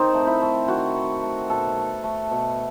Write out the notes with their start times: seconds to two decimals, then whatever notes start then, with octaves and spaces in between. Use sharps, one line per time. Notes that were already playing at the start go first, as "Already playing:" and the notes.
Already playing: D#3 C4 D#4
0.14 A3
0.27 E4
0.42 A3
0.68 D#3 F#4
0.96 D#3
1.22 A3
1.49 B2 A4
1.77 A3
2.03 A3
2.31 B2